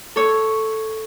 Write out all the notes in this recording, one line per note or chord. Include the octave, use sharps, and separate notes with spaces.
A4 C#5